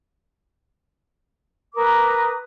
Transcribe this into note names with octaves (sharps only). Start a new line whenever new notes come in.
A#4 B4 D6 D#6